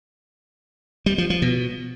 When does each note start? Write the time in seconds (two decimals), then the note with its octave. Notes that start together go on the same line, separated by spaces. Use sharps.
1.06 G3
1.18 F3
1.30 F3
1.42 B2